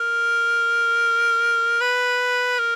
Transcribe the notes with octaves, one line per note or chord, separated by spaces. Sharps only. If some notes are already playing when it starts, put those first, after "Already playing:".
Already playing: A#4
B4
A#4